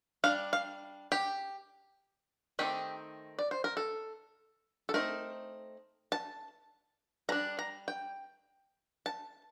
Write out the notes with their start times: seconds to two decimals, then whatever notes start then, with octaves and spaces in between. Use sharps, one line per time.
0.24 G3 D4 F5
0.53 F5
1.12 G4
2.59 D#3 A3 C4 D#4 G4
3.39 D5
3.51 C5
3.64 A#4
3.77 A4
4.89 A4
4.94 A3 C4 D#4 A#4
6.12 A5
7.29 G3 A#5
7.32 D4
7.59 A#5
7.88 G5
9.06 A5